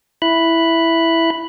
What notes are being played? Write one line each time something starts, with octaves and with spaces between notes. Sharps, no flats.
E4 B5 F#6